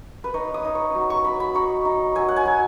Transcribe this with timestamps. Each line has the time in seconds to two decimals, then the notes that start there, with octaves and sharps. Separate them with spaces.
0.24 B4
0.34 D#4 C#5
0.54 D#6
0.64 D#4
0.75 C#6
0.95 F#3
1.10 C#6
1.24 F#3 B5
1.40 B5
1.55 D#4 C#6
1.85 D#4
2.15 F#3 G#5
2.28 F#5
2.36 G#5
2.45 F#3